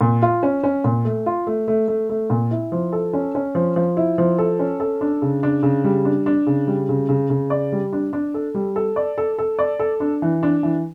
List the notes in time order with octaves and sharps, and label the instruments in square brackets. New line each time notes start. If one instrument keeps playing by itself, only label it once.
[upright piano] A#2
F4
C#4
C#4
A#2
A3
F4
A3
A3
A3
A3
A#2
E4
F3
A4
C#4
C#4
F3
F3
E4
F3
A4
C#4
A4
D4
C#3
D4
C#3
G3
D4
D4
C#3
G3
C#3
C#3
C#3
D5
G3
D4
D4
A4
G3
A4
D5
A4
A4
D5
A4
D4
E3
D4
E3